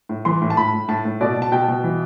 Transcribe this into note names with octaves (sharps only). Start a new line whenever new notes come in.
A2
E3 C6
A2
A5
A2 B5
A2
A2 A5
A2
B2 D5
B2 A5
B2 G5
B2
E3